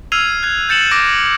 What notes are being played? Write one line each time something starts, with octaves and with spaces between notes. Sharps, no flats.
E6 F6 G#6 C7 D#7 F7
F#6 G#6
G6 A6 C#7 E7 F#7
D6 A#6 D7